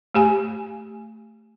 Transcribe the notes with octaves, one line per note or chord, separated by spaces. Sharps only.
A3 G4 G#5